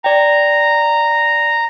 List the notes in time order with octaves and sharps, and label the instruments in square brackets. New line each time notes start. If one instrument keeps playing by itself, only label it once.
[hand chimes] D5 G5 [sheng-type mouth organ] A#5